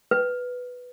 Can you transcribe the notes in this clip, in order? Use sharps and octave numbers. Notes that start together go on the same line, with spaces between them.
B4